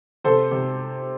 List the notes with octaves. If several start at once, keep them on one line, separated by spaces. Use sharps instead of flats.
C3 A4 C5
C3